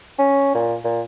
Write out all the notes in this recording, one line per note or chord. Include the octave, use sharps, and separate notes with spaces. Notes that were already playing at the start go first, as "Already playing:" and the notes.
C#4
A#2
A#2